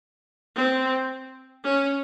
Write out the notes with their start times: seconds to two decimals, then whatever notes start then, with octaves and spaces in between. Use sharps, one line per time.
0.56 C4
1.64 C#4